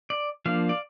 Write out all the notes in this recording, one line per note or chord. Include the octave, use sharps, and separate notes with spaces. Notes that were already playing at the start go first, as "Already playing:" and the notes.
D5
F3 A#3 D4 F5
D5